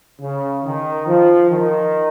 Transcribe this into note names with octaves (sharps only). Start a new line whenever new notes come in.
C#3
D#3
F3
D#3